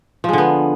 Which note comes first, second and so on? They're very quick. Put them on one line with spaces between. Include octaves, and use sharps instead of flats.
F3 G#3 D3 B3